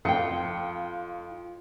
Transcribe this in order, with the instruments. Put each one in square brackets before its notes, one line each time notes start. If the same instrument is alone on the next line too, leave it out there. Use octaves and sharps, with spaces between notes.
[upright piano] F2 C#7 [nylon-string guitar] F4 G5